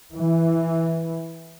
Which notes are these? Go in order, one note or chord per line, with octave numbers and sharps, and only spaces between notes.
E3